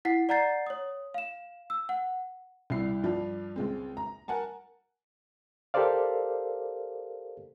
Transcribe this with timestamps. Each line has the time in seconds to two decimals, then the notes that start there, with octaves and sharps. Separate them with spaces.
0.05 E4 F#5 B6 C7
0.29 D5 F#5 A#5 G6 A6 C7
0.66 C#5 D#6
1.14 F5 E7
1.70 E6
1.89 F#5
2.70 C2 G3 E4 C7
3.03 G2 F3 G3
3.56 C#2 G#3 C4
3.97 A#5
4.28 A#4 F#5 G#5 A5
5.74 G4 A4 A#4 C5 D5 F5